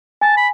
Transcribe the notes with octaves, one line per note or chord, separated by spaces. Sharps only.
G#5 A5
B5